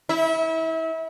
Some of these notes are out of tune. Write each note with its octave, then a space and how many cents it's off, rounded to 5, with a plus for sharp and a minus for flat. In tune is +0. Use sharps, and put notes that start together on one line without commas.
E4 -30